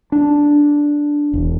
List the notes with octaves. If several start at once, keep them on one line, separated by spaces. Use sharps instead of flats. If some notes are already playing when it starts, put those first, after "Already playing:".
D4
E1